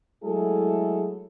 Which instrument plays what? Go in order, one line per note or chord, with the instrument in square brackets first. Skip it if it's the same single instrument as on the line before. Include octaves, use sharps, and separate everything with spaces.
[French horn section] F#3 G#3 A3 E4 G#4 A4